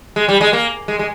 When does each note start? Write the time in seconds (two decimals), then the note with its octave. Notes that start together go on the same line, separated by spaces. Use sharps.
0.16 G#3
0.29 G3
0.41 G#3
0.53 A#3
0.88 G#3
0.99 G#3